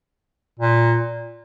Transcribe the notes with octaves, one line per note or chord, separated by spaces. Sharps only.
A#2